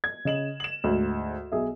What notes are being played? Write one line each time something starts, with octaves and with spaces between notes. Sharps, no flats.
G#6
C#3 D#5 E7 F#7
E7 F#7
D2 G#2
B1 G#4 E5